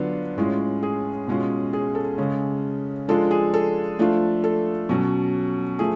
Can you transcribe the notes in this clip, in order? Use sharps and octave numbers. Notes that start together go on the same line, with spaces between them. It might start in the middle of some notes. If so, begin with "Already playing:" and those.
Already playing: D3 F#3 B3 D4 F4
A2 G#3 C#4 F4
G#4
B2 G#3 C#4 F4
G#4
A4
C#3 G#3 C#4
F3 G#3 D4 F4 A4
G#4
A4
F3 A3 D4 F4
A4
B2 F#3 C#4
F3 A3 G#4